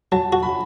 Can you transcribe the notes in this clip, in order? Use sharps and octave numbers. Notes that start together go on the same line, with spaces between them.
F#3 A5
F#4
B5